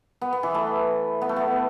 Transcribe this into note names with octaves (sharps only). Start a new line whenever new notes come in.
B3
B3
E3
A3
B3
A3
B3